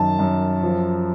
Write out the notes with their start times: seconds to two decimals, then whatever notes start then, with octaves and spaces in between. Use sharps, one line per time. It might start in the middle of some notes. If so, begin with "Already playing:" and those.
Already playing: F#2 D#3 A5
0.19 F#2
0.63 F3